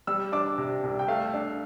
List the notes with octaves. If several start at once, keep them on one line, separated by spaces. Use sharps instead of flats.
G3 E6
D4 D6
C3
C2
G5
A3 F5
D4